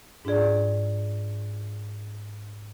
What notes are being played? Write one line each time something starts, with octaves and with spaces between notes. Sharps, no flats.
G#2 D4 F4 G#4 D5